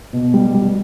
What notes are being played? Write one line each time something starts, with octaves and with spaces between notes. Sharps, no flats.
B2
G3
G3